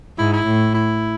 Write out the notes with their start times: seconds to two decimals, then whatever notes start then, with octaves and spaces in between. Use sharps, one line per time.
0.18 G#2 E4
0.33 E4
0.47 A2
0.74 E4